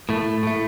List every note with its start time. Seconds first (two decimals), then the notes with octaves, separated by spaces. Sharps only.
0.09 A2 A3
0.43 A2 A3